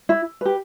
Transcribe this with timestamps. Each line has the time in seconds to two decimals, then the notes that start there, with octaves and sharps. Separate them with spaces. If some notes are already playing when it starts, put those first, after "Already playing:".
0.09 E4
0.41 G4 B4